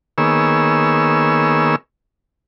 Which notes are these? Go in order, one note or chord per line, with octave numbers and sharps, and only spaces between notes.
D#3 A#3 B3 G#4 C#5 E6